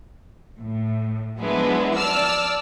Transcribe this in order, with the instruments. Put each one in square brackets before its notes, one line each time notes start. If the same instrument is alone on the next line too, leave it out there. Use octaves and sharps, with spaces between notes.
[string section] A2
F3 F#3 G#3 B3 D4 E4
D5 A5 E6 F6